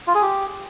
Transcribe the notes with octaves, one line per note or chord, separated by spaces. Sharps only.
F4
G#4
G4